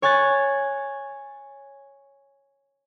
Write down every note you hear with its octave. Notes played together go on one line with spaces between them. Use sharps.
C#5 G#5 C#6 F#6 A6